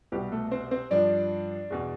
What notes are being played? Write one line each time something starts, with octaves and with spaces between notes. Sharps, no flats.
C2 B2 G3 G4
A3 A4
C4 C5
C4 C5
G2 F3 D4 D5
E2 B2